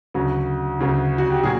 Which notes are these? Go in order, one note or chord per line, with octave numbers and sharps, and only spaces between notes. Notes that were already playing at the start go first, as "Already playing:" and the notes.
D2 C#3 F#3
D2 C#3 F#3
F#4
G4
A#2 F#3 G#4